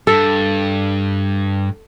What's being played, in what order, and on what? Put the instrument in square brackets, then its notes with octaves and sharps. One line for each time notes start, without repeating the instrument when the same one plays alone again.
[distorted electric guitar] G2 [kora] A4